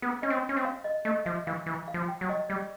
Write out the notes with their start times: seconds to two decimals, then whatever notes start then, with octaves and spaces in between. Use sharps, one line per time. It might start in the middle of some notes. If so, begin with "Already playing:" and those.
0.02 B3 A#4
0.22 C#4 D#5
0.30 C4
0.49 C#4
0.57 C4
0.65 F5
0.84 D#5
1.05 A3 D#5
1.25 F3 E5
1.47 E3 F5
1.66 E3
1.88 F5
1.94 F3
2.08 G5
2.21 F#3
2.29 D#5
2.49 G3 D5